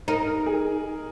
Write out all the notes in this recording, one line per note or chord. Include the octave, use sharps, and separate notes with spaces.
D#4 A#4
A#4
G#4